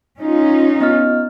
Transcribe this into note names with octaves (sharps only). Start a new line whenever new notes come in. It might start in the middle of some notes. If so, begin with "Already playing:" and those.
C#4 D#4 F4
B3 D#5 F6